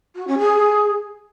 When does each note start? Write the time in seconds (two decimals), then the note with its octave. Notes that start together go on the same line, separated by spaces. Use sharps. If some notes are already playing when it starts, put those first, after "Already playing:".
0.15 F#4
0.27 C#4
0.39 G#4